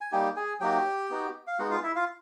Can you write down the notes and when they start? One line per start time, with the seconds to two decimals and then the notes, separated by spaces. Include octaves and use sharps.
0.01 G#5
0.12 G3 A#3 D#4 G4 G5
0.36 G#4 G#5
0.60 F#3 A#3 D#4 F#4 G4 G5
1.10 B3 D#4 F#4
1.47 F5
1.59 G#3 B3 D#4 F#4 F#5
1.71 F4 F5
1.83 E4 E5
1.96 F4 F5